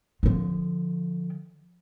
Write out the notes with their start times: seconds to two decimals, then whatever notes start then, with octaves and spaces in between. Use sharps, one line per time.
0.23 D3 F3